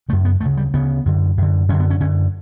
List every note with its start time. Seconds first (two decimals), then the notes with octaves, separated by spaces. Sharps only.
0.09 C#3 A3
0.12 F#2
0.25 B3
0.41 D2 C#3 A3
0.57 G3
0.74 D2 C#3 B3
1.06 F#2 D3
1.37 F#2 D3
1.69 F#2 C#4
1.72 D3
1.80 B3
1.90 C#4
2.00 F#2 D3 C#4